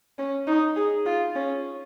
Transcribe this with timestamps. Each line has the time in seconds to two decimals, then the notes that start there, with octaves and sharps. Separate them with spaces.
0.19 C#4
0.47 D#4
0.76 G#4
1.06 F4
1.35 C#4